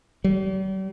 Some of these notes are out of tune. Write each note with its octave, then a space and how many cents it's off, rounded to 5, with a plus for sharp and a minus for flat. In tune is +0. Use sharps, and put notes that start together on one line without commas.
G3 -40